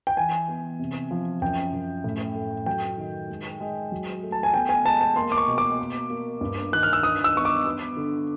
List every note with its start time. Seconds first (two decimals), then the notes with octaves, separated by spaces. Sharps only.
0.07 G5
0.17 E3 G#5
0.48 B3
0.79 C3
1.11 F3
1.42 F#2 G5
1.73 F#2
2.04 A2
2.35 A3
2.66 F#3 G5
2.98 D#3
3.29 G#3
3.61 G#3
3.92 F#3
4.23 A3
4.32 A5
4.43 G#5
4.54 B3 G5
4.69 G#5
4.85 G#3 A5
5.01 A5
5.16 A#3 C6
5.32 D6
5.38 C#6
5.47 B2
5.58 D6
5.79 A#3
6.10 A#3
6.41 G2
6.72 D#3 F#6
6.83 F6
6.93 E6
7.03 D#3 D#6
7.24 E6
7.34 B3 C#6
7.45 D6
7.66 B3
7.97 D3